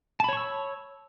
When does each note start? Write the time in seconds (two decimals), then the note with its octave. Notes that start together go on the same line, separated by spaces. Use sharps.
0.20 A5
0.24 B5
0.29 C#5
0.33 C#6
0.37 E6